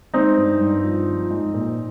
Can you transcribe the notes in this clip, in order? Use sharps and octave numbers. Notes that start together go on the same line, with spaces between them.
G#3 C4 D#4
G2
G2
F3
F3
G#2
A#2